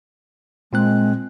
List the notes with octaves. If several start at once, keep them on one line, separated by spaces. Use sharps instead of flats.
A#2 G#3 C4 F#6